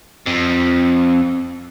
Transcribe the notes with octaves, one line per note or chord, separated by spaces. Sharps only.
F2